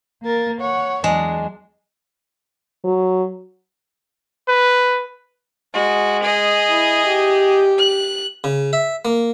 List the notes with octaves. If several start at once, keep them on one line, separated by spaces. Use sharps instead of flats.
A#3 A#4 A6
C#5 F#5
E2 F#3 G#3 D4
F#3
B4
G#3 F#4
G#4 D#5
E4
G4
F#6
C#3
E5
A#3